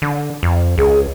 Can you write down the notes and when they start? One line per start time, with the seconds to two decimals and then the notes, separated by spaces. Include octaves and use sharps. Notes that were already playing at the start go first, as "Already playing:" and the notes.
0.02 D3
0.43 F2
0.78 C#2 G#4